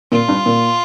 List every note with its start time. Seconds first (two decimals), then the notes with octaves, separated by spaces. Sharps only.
0.12 A#2 F4
0.28 G2
0.46 A#2